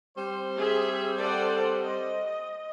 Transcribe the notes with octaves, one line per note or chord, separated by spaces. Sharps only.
G3 C4 C5
G#4 E5
A4 D5 F#5
D#5